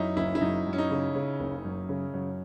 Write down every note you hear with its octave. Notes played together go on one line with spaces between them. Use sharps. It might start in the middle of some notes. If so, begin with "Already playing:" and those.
Already playing: F#2 C#4 D#4 E4
F#1 E4
E4
F#2 D#4
F#2
C#4
D#4
C#3
C#3
F#1
F#2
C#3
F#2